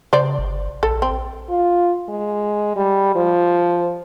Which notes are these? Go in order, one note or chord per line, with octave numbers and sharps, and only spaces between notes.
C#3 C5 D5
G1
A#1 A4
C4
F4
G#3
G3
F3